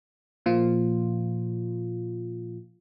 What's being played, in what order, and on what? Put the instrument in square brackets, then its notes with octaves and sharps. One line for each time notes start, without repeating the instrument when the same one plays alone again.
[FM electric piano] A#2 F3 F4